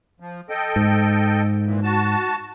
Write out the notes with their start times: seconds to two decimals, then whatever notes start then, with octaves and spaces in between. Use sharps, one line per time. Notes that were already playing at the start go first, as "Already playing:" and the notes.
0.20 F3
0.50 A4 D#5 G5
0.76 G#2
1.65 A#2 E3
1.83 F#4 A5